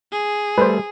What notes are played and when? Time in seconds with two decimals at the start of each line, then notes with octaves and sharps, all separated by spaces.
0.12 G#4
0.58 G3 A3 B4 C5